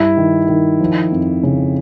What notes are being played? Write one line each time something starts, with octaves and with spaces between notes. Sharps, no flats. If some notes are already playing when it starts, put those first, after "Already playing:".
Already playing: G2 E4
D#3
D#3
F3
F2
C#3